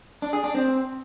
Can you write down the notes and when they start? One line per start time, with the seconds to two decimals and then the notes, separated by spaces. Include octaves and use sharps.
0.22 D4
0.33 G#4
0.44 D4
0.55 C4